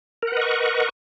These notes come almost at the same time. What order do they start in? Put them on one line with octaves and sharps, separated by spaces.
A#4 F#5 B4 D#5 C#6